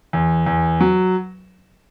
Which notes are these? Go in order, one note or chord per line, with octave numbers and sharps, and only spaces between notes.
E2
E2
F#3